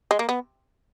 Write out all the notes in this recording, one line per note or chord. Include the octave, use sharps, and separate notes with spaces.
G#3
A#3
B3